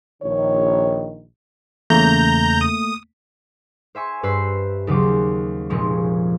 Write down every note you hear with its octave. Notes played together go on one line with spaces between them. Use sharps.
A#1 D#3 C#5
E2 C#3 A3 A#3 A#5 G6
D#6
C5 E5 G#5 C#6
G2 B4 C5 E6 C7
D#2 C#3 F#3 C5 D6
F1 A#2 F3 G#3 C#6